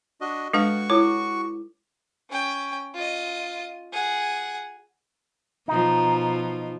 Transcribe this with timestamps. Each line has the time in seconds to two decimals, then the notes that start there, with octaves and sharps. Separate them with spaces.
0.21 D4 F#4 D#5
0.53 G#3 D4 F#4 A4 B4 F5 C#6
0.90 E4 A4 C#5 D6
2.30 C#4 G5
2.94 F4 D#5
3.93 G#4 F#5
5.68 B2 F3 D#4